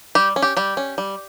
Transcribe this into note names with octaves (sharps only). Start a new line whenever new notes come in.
G3 G4
C#4
G4
G3 G4
C#4
G3